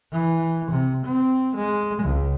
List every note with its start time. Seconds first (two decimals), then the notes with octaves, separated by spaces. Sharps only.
0.12 E3
0.71 C3
1.05 C4
1.56 G#3
2.03 C#2